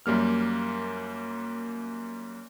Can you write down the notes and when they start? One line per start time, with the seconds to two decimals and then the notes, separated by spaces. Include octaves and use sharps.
0.06 F#2 G3 A#3 F6